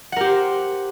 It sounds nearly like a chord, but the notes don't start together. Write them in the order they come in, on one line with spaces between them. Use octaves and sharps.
F#5 A#4 G4 C5